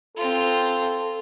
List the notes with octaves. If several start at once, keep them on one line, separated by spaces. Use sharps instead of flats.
C4 F4 A4